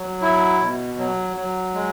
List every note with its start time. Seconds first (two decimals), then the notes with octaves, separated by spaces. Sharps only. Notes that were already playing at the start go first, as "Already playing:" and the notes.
Already playing: F#3
0.22 E4
0.61 B2
0.99 F#3
1.36 F#3
1.75 G#3